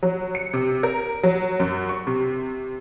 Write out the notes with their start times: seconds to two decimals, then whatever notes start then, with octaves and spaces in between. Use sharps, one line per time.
0.03 F#3
0.35 C#7
0.53 C3
0.83 A#4
1.23 F#3
1.60 F#2
1.89 C#6
2.07 C3